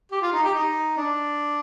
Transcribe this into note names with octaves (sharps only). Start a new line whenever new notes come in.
G4
F4
D#4
G4
D#4
D4